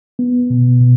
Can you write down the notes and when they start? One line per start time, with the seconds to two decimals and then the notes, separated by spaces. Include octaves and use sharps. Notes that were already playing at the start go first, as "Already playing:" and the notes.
0.19 B3
0.50 B2
0.80 B2